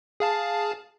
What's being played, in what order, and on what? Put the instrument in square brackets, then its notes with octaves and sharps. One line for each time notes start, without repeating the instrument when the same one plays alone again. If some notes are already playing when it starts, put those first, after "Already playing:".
[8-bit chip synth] G#4 F5 A5